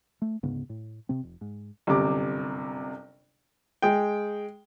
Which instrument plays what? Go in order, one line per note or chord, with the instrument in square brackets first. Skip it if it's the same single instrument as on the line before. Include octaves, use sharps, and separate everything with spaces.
[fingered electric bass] A3
D2 G#2 C#3 B3
A2
C3 C4
F1
G#2
[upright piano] G1 F#2 C3 D6
[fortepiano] G#3 G5